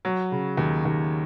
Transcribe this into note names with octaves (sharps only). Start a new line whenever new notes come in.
F#3
C#3
D#2
D#2